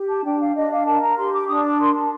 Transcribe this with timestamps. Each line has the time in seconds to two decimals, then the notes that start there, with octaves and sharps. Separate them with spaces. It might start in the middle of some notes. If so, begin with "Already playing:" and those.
Already playing: G4
0.09 A5
0.24 D4 G5
0.40 F5
0.55 D4 D#5
0.71 F5
0.86 A#4 A5
1.02 A#5
1.17 G4 C6
1.32 D6
1.48 D4 D#6
1.64 D6
1.79 A#4 C6
1.94 A5